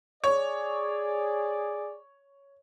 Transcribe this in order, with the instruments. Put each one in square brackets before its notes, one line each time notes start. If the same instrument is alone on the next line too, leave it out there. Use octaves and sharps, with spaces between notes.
[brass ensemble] G#4 D5 [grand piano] C#5